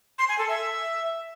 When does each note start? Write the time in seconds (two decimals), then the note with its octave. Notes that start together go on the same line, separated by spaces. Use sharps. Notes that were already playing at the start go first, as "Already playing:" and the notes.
0.18 C6
0.28 G#5
0.38 A4
0.48 E5